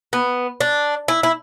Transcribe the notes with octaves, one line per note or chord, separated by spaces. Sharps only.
B3
D4
E4
E4